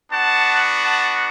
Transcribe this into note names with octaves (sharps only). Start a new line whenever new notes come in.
B3 D4 F#4 F#5 A5
F#5 A5